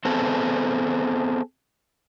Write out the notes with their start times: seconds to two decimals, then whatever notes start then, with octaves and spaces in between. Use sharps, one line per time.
0.05 B3 C4 G#4 A4